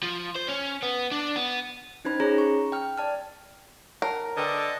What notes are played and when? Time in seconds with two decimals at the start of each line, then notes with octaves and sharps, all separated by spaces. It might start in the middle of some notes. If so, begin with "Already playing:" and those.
0.03 F3
0.35 C5
0.48 C#4
0.82 B3
1.11 D4
1.36 B3
2.05 C#4 D#4 C5 B5
2.20 C#4 G#4 C#5 A#5
2.38 C#6
2.72 G5 F6
2.98 D5 A5 F6
4.02 A#4 C#5 F#5 A5
4.37 D3 B4 D#5 G5 A5 D6